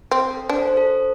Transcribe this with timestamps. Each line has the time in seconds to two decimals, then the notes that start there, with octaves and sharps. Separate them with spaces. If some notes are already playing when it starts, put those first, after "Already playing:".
0.11 C4
0.31 A4
0.49 D4 C5
0.58 A4
0.68 C5
0.77 A4
0.87 C5